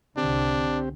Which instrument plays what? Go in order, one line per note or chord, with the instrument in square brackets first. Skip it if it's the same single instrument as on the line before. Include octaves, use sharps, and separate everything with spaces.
[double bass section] C2 D3 [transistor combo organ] C4 G4 [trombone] D4